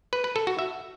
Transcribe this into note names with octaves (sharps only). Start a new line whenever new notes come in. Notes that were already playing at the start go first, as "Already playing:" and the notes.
B4
B4
A4
F#4
E5